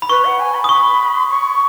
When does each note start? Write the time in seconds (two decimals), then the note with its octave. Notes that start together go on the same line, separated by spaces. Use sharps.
0.02 B5
0.09 B4 C#6
0.25 F#5
0.40 G#5
0.54 B5
0.64 D#6
0.69 B5 C#6
1.30 C#6